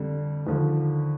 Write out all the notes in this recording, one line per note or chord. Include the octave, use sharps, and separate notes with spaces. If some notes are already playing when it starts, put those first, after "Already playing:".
Already playing: F2 D3 G3
D#2 D3 F3